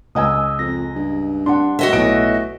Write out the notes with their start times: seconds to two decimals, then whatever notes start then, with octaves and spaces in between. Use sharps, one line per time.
0.15 C#2 D#5 G#5 D#6 E6
0.59 F2 A#6
0.96 G2
1.46 D4 F#5 C6
1.79 F#4 D#5 E5
1.93 B1 A2 B4 D7